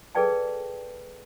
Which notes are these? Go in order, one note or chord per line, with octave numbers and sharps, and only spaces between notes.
G#4 A4 B4 D5 G5 A5